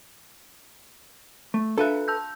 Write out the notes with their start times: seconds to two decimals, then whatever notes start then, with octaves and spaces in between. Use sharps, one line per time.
1.54 A3
1.78 D4 A4 B4 E5 F5 F#6
2.08 A5 E6 G6